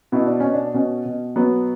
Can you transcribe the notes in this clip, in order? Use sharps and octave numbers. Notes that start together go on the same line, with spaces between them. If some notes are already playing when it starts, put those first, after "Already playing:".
B2 E4
D4
B2 C#4
D4
B2 C#4
B2
F#3 B3